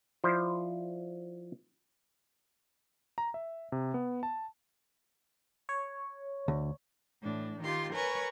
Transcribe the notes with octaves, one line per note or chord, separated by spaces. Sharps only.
F3 E4 C5 D5
A#5
E5
C3
B3
A5
C#5
D2
A2 E3 D4
D#3 F4 G4 C6
A#4 B4 C#5 G#5 C#6